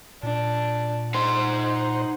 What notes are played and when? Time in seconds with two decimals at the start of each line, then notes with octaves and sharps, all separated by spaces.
0.23 A#2 D4
1.15 D#4 C5 F#5 C6